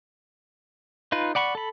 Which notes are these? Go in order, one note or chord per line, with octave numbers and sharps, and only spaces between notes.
D#4 F4 B4
D5 F#5 B5 C#6
A4 B5